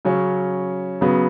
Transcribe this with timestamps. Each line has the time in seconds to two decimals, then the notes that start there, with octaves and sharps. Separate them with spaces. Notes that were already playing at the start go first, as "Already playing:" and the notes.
0.05 C#3 F#3 C#4
1.01 C#3 F#3 B3